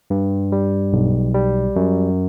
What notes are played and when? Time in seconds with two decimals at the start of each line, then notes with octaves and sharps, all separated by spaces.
0.10 G2
0.52 G3
0.93 B1
1.34 G3
1.76 F#2